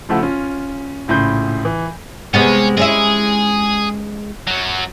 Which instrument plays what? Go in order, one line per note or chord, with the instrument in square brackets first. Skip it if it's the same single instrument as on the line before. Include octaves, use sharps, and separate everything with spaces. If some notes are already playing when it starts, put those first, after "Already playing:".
[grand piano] C#3 F3 A3 E4 F#4 A4
C#4 F4
A#1 A2 C#3 B5 C6 G6
E3
[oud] C3 G#3 B3 [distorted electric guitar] C#4
[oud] G#3 C#4 E4 [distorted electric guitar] G#4
[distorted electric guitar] F#2 F#3